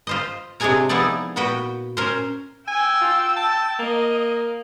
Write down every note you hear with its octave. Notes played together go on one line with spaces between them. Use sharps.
F4 C5 D#5
C3 G#3 D4 G#4 G#5 A#5
F3 B3 D#4 E4 G#4 D5
A#2 B3 F#4 B4 G5
C#4 A#4 C5
G5 G#5 E6
F4
A5
A#3 D#5